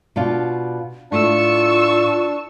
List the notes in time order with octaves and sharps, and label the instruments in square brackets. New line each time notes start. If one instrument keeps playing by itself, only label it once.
[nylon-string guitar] B2 D4 F4
[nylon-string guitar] A2 [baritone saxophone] D4 [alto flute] F4 [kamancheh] C#6 E6